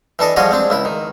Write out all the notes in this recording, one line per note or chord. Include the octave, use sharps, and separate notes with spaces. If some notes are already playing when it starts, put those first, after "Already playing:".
E3 D4 A4 D#5
F3 G3 F#4 G#4 C#5 D#5
G#3 C4 D4
C#2 E4 B5
D#3